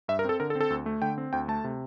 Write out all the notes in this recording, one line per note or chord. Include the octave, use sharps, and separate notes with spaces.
G2 E5
A#4
C4 A4
D3 A#4
A4
C4
A4
D2
A3
D3 G5
C4
D2 G5
A3 A5
C3